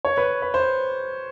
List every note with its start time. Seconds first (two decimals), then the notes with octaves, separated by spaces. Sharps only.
0.05 C#5
0.17 B4
0.42 B4
0.54 C5